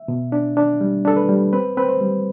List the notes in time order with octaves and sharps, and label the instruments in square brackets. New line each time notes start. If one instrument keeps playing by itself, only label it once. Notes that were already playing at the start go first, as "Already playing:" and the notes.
Already playing: [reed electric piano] E5
B2
D4
D4
G3
D4 A4
B4
G3
C4 B4
C4 B4
C5
G3